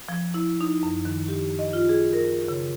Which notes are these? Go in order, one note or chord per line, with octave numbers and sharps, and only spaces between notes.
F3
E4
D#4
F#2
D#3
G4
D#5
F4
G#4
A#4
C#3